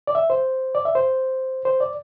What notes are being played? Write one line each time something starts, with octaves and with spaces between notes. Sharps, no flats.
D5
E5
C5
D5
E5
C5
C5
D5